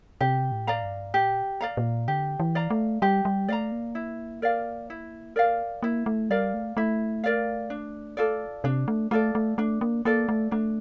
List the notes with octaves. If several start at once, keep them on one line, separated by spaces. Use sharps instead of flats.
C3 G4
A2
D5 F5 A#5
G2
A#2 G4
D5 F5 A#5
A#2
D3 G4
E3
D5 F5 A#5
A3
G3 G4
G3
A3 D5 F5 A#5
A#3
E4
A#4 D5 F5
E4
A#4 D5 F5
A#3 E4
A3
G3 A#4 D5 F5
A3
A3 E4
A#4 D5 F5
D4
F4 A4 D5
C3 D4
A3
A3 F4 A4 D5
A3
A3 D4
A#3
A#3 F4 A4 D5
A3
A3 D4